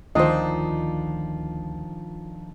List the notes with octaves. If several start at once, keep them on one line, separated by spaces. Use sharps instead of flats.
D2 D#3 F3 D4 D#4 F4 C5 D#5